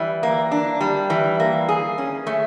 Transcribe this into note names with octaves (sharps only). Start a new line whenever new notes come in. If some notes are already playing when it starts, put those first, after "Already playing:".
Already playing: E3 G3
A#3
D4
G3
E3
A#3
G#4
C#4
A3